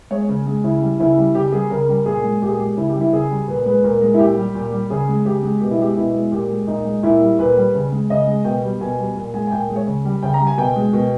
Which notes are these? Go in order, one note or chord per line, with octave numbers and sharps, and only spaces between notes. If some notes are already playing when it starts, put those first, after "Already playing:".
G#3 C#5
C#3
G#3
C#3 E4
G3
C#3 E4
G3
C#3 G4
G3 G#4
C#3 A#4
G3
A#2 G#4
G#3
A#2 G4
G#4
G#3 G4
C#3 E4
G4
G3
E4
C#3 G#4
G3
A#2 B4
G#3 B4
A#2 A#4
G#3
E4
A#2 G4
G3
A#2
G3
C#3 G#4
G#3
C#3 G4
G#3
B2 G4
E4
G#3 G4
B2 E4
G#3
A#2 G4
G#3
A#2 D#4
G#3
A#2 E4
G3
A#2 B4
G3
C#3
G#3
C#3 D#5
G#3
B2 G5
G3
B2 G#5
G3
A#2
G#3 G#5
G#5
A#2 G5
G#3
C#5
C#3
G3
C#3 G5
A#5
G3
G#5
B2 G5
G#3
B2